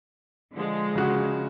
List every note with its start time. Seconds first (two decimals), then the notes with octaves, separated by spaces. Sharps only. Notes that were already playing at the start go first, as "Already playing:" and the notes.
0.54 D3 F3 G#3
0.95 C#3 F#4